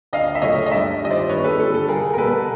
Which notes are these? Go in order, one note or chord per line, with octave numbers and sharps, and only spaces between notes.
D2 D#5 F5
E5
C#3 F#3 A3 C#5 D#5
D#5
G2 D5 E5
D#3 G3 D#5
C5 D5
G2 B4 C#5
A4 B4
D3 G3 A4
A4
C2 G#4 A#4
A#4
B2 G3 A4 B4